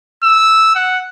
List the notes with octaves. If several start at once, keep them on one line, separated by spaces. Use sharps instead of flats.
E6
F#5